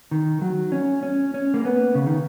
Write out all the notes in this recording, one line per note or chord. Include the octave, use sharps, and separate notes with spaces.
D#3
F#3
C#4
C#4
C#4
A#3
B3
C#3
D#3